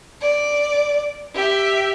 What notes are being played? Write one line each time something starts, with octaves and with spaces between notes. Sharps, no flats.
D5
G4 E5